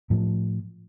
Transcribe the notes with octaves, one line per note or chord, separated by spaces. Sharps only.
A2 F3